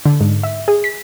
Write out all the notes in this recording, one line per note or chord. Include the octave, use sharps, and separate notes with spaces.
D3
G#2
E5
G#4
B6